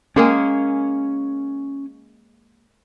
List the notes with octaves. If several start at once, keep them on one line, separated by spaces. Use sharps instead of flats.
G#3 A#3 C#4 G#4